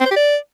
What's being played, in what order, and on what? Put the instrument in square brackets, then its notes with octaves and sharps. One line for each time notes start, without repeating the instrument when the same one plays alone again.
[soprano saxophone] C4
C5
G4
D5